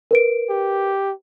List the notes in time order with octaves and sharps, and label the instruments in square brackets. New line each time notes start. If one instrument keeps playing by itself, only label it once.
[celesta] A#4 B4 D7
[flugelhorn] G4